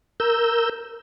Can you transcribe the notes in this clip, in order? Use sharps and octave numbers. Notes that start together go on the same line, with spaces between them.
A#4 E6 G6